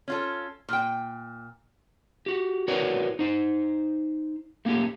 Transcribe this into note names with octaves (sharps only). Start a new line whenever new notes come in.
C#4 F4 A4
A#2 G5
F#4 G4
E4 F#4 A#4 B4 C#5 D5
D#4 C5
A3 A#3 C#4 F4 G4